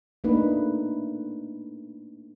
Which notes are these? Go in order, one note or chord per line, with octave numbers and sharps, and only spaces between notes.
A3 A#3 D4 D#4 B4